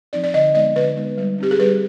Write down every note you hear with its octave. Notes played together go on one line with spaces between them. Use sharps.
F3 C4 D#4 D5
D5
D3 D#5
G#3 B3 D#4 D#5
D3 B4
G#3 B3 D#4
G3
C4 D#4 G4
G#4
G3 B4